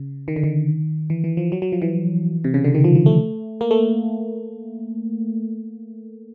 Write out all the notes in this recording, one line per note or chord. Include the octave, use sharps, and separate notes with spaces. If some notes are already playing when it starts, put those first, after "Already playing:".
Already playing: C#3
D#3
D3
D#3
E3
E3
F3
F#3
F#3
F3
E3
C3
C#3
D3
D#3
F3
F3
A3
A#3
A3